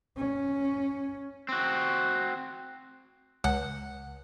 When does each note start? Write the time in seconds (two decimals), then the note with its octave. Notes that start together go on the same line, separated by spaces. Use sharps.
0.17 C#4
1.49 C4 F#4
3.44 C#2 F#5